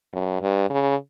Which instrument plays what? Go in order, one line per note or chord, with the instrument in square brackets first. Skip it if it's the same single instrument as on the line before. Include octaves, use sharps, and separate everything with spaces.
[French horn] F#2
G2
C#3